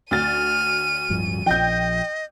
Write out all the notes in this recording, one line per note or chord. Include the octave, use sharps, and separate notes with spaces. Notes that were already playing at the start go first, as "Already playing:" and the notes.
D2 F6 A6 D#7
D1 G2 F3
A#1 F3 D#5 G5 G6